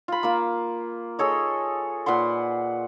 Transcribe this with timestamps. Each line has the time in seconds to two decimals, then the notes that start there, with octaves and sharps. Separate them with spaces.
0.08 F4 B5
0.23 A#3 F4
1.19 G#4 A4 C#5 D#5
2.06 A#2 B4 F#5 C6